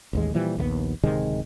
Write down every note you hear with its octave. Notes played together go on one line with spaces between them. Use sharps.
A1 D#2 G#3
A#2 E3 F3 G3
A#1 D#2 G#3 B3
D1 C3 D#3 G#3